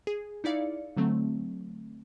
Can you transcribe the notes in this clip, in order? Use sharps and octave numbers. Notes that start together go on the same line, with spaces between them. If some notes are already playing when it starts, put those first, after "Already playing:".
G#4
D#4 E4 D5 F5 C#7
D3 F#3 A3 C4